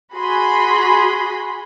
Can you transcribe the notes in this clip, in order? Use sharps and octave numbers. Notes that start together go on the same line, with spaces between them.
F#4 G#4 B5 C6